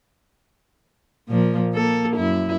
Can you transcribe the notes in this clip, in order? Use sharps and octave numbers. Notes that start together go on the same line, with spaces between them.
A#2 F3 A#3
A#3 A4
F#2 E4